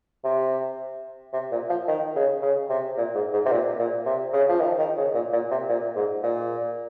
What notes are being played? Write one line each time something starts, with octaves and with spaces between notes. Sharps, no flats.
C3
C3
A#2
F3
D#3
C#3
C#3
C3
A#2
G#2
G#2
C3
A#2
A#2
C3
C#3
F3
D#3
D#3
C#3
A#2
A#2
C3
A#2
G#2
A#2